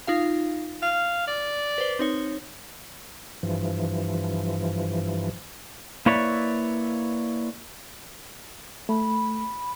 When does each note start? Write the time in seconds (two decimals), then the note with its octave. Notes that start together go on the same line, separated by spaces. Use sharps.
0.07 D#4 F4 F5
0.82 F5 F6
1.27 D5
1.78 B4 C5
1.99 C4 D#4 C#5
3.43 G2 E3 F3
6.06 A#3 E4 B4 C#5 D5 E5
8.89 A3 B5